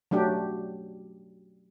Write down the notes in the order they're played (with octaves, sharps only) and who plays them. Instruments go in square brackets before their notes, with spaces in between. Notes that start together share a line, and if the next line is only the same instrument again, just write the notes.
[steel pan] F#3 A3 D4 G4